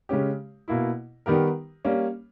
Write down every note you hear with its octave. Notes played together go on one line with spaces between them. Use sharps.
C#3 G#3 C#4 G4
B2 A#3 E4
D#3 G3 B3 G4 A#4
G3 A#3 C#4